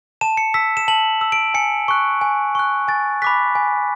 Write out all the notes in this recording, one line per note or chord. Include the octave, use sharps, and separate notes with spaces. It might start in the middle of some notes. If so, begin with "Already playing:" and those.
A5 E7
C#7
E6 B6
E7
A5 F#7
E6
D7
G#5 C#7
C#6 F#6
G#5
C#6 F#6
G#5 A6
B5 D6 F#6 B6
G#5